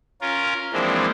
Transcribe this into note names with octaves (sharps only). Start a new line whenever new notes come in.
C#4 F4 A#4
E3 F3 G#3 A#3 C4 D4